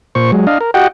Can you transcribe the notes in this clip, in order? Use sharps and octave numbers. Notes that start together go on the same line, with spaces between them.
A#2 C5 C#6
F#3 G#3
D4 D#5 F5
A#4
F#4 G4 D#5 F#5 G5